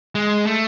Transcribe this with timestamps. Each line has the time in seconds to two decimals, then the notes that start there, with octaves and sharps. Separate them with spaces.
0.15 G#3
0.46 A3